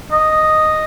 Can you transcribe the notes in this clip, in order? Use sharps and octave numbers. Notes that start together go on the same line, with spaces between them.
D#5